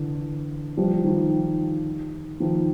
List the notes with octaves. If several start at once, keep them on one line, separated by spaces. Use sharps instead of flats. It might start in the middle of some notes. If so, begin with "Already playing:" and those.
Already playing: D3 E3
F3 G3
D#3 F3
D#3 F3